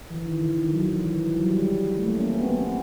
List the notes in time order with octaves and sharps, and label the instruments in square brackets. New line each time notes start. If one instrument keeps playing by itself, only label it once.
[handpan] E3
D#3
D3
D#3
F#3
F3
E3
F3
F#3
G3
G#3
A3
A#3
C#4
C4
B3
B3
C4